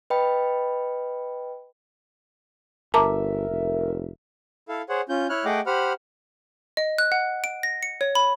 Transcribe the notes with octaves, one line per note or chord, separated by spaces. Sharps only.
B4 D#5 G5 B5
G1 A#4 E5 A5 A#5 D6
F1
E4 A4 F5
G#4 C5 C#5 F#5
C#4 F4 G6
E4 C#5 F6 F#6
A3 G#4 D#5 F#5 G5 D6
G4 C5 F#5 B5 F6
D#5
F#6
F#5
D7
A#6
C#7
C#5
B5